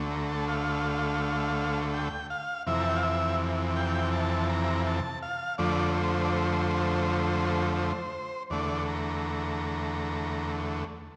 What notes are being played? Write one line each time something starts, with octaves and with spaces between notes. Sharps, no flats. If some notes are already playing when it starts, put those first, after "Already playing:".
Already playing: D2 D3 A3
A#5
A5
F5
G5
F5
F2 C3 E3 E5
A#5
A5
G5
F5
E5
G5
A5
A#5
A5
F5
F2 D3 F3 A3 D5
C5
D5
C5
C5
E2 D3 A3 D5
A#5